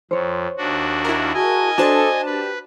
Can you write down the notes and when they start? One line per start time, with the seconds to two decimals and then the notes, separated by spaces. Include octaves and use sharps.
0.11 F2 C5 C#5
0.58 D#2 D4 F#4
1.05 E4 A#4
1.34 F#4 G#4 D#5 G#5 A5
1.78 D4 F#4 A4 C5 A5 D#6
2.26 G4 B4